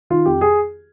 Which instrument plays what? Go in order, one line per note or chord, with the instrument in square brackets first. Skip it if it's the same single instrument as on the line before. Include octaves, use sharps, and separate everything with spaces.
[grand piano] D#3 F4
F2 G4
G#4